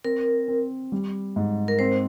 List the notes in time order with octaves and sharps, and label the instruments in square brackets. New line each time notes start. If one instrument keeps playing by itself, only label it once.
[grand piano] C4 [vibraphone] A#4
[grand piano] C4
G3
G#2
[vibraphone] A#4
[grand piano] C4 [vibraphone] C5